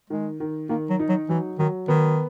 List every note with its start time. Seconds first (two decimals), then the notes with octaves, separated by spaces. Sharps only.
0.10 D#3 G#3
0.40 D#3
0.69 D#3 A#3
0.90 F#3
1.00 D#4
1.09 F#3
1.29 E3 F#3
1.59 D#3 F#3
1.88 D#3 B3